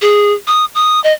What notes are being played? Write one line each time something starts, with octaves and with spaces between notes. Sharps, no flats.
G#4
D#6
D#6
D#5